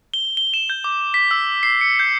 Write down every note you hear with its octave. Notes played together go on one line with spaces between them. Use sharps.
G7
G7
E7
G6
D6
B6
E6
C7
C#7
G6